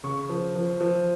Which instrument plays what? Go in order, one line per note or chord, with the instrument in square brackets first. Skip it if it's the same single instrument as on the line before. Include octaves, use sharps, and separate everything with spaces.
[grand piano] C#3 C#6
F3
F3
F3